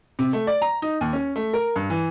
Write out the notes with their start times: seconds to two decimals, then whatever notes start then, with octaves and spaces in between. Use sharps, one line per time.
0.19 C3
0.33 A3
0.47 D5
0.62 A#5
0.82 D#4
1.01 D#2
1.13 C#4
1.36 A3
1.53 A#4
1.76 G2
1.90 E3